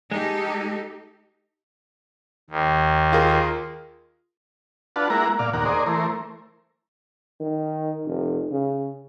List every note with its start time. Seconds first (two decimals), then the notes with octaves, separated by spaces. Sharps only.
0.11 G#3 D#4 G4 A4
2.50 D#2
3.13 F4 G#4 A#4
4.96 D4 F4 B4 F#5 A5
5.10 G#3 A#3 E4 A#4 F#5 A#5
5.39 A#2 D5 F5
5.53 D#2 A#2 A#4 F#5
5.65 G#4 A#4 C5 D5 D#5
5.86 E3 A3 A#4 C5
7.40 D#3
8.06 F1
8.51 C#3